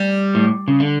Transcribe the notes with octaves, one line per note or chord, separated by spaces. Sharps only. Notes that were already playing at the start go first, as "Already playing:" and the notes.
Already playing: G3
A2
C#3
D3